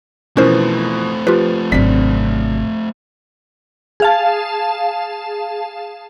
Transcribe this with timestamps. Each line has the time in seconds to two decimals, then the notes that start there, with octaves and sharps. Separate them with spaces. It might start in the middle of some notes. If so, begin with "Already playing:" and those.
0.37 B2 E3 F3 A3 C4 C#4 A#4 C5
1.27 F3 F4 G4 B4
1.72 G#1 F#2 C3 D4 B6
4.00 G#4 F5 A5